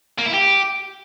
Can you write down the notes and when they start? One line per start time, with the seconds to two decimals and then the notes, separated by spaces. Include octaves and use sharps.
0.19 A#3
0.26 E4
0.34 G4